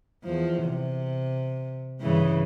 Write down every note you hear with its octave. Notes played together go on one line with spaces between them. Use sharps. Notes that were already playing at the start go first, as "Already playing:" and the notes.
E2 F3
C3
G2 C#3 E3